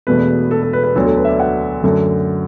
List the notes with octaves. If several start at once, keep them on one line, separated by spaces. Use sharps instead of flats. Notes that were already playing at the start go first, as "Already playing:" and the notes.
E1 E2 B2 A3 B4
A4
A4
B4
B4
D2 D3 F#3 B3 A4
A4
B4
E5
D5
F#5
F#2 D3 A3